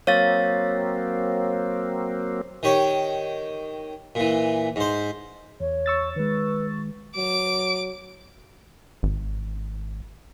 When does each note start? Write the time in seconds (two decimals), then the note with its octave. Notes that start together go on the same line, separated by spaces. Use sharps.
0.07 F#3 A#3 C4 C#5 F5 A6
2.63 D#3 G4 C#5
4.15 A#2 E3
4.76 G#2 C5
5.60 E2 C#5
5.86 C#6 E6 A6
6.16 D#3 G#3 B4
7.16 F#3 D6 D7
9.03 G#1